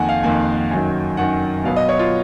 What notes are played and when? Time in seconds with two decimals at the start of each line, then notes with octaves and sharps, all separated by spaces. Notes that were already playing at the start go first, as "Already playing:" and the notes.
Already playing: F2 D#3 A#3 F#5 G#5
0.09 F5
0.23 F2 D#3 A#3 G#5
0.71 F#2 D#3 F#3
1.17 F#2 D#3 F#3 F#5
1.64 B2 F#3 B3 F5
1.76 D#5
1.89 C#5
1.99 F4